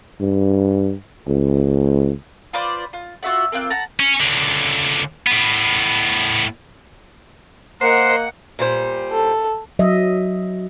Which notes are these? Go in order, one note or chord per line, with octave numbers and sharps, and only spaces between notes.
G2
C#2
F4 B4 C5 D5
F4
F4 F#4 E5 F#5
A#3 C4 F4 F#6
F#5 A5 A#5
C#4
C#2 D3
A2 B3
A#3 A#4 C5 D#5 F#5
A#2 G3 C5
A4
F#3 D#5 E5